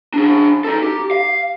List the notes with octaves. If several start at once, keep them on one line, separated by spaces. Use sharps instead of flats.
D4 G#4
D#4 A4
G4
F5